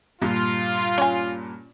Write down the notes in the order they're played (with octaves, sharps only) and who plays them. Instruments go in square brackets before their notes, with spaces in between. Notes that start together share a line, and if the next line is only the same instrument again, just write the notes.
[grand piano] G2 A#2 [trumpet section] F4
[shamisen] C#4 G#5